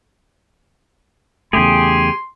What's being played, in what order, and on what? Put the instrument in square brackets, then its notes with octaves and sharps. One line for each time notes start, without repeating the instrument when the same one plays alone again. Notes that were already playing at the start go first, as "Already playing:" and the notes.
[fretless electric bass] E2 C#3 A3 [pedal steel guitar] G4 G#4 [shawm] C6